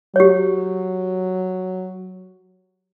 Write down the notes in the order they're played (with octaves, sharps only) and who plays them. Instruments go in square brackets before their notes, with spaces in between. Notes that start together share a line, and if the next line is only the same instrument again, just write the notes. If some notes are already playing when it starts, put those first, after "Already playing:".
[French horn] F#3 [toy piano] G4 C#5